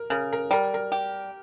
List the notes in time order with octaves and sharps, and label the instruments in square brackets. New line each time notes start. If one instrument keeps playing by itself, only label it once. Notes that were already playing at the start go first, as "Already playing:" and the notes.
Already playing: [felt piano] A#4
[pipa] C#3 [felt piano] A#4
[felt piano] A#4
[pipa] G3 [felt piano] A#4
[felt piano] A#4
[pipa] G4